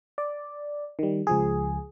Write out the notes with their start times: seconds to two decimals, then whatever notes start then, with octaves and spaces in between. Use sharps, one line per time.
0.18 D5
0.99 D#3 G3
1.27 C#2 F3 G#4